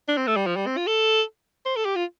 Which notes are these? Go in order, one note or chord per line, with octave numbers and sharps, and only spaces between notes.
D4
C4
A3
G3
F3
G3
C4
F4
A4
C5
A4
G4
F4